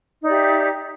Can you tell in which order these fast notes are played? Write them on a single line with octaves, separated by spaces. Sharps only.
D#4 D5 G4 E5